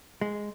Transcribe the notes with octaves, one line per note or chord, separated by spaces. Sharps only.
G#3